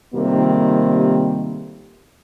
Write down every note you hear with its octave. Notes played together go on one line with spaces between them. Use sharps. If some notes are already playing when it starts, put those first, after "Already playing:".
F2 G#2 C3 D#3 G3 A#3